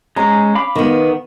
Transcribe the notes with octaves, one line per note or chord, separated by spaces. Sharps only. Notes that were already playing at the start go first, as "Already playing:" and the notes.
G#3 C#4 A#5
F5 B5 D6
D#3 B3